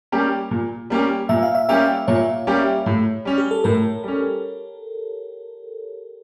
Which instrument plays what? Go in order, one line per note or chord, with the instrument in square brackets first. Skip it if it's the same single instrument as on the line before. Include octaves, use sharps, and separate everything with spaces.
[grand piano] G3 A#3 C#4 G4
A#2
G3 A#3 C#4 G4
[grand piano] A#2 [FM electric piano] E5
[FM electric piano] F5
E5
[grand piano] G3 A#3 C#4 G4 [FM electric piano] E5
[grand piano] A#2 [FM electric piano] C#5
[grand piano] G3 A#3 C#4 G4
A2
G3 C#4
[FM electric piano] G4
A4
[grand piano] A2 [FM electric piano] A#4
[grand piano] G3 C#4